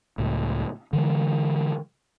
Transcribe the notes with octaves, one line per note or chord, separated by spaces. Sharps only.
C#2 A2
D3 E3 G#3